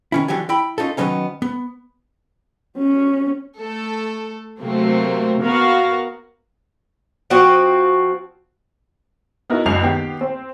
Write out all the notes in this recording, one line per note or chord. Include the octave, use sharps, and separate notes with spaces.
D#3 C#4 E4
D3 E3 F#3 G4 G#5
E4 G5 B5
C#4 D#4 F4 A4
D#3 F3 F#3 B3 C#4 D#4
B3
C#4
A3 A4
C3 F#3 A3 A#3 C4
A#3 B3 F#4 A#4 F5
F3 C4 F#4
B3 D#4 E4 F#4 A#4
F#1 C#2 F#2 C7 F7
D#3 B3 G4
C4